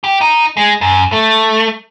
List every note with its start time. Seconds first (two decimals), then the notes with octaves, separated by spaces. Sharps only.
0.04 G4
0.21 D#4
0.57 G#3
0.81 F#2
1.12 A3